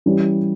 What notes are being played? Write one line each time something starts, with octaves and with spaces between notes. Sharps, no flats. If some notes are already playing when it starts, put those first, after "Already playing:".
E3 G3 C#4